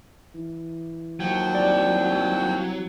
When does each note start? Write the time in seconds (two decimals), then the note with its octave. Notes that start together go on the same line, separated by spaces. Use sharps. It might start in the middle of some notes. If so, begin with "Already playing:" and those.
0.34 E3
1.20 D#2 F3 F#3 G5
1.55 C2 D5